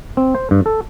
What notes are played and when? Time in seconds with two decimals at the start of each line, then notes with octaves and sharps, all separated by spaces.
0.17 C4
0.35 C5
0.51 G2
0.66 A4